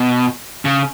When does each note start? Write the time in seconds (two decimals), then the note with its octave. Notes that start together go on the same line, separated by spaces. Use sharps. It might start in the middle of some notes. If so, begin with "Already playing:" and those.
Already playing: B2
0.65 C#3